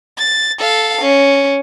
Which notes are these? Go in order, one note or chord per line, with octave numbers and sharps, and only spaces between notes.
A6
A4 F5
C#4